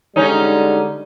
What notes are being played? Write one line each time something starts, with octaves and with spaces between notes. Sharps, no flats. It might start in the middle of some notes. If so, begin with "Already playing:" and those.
D3 G3 G#3 C#4 D#4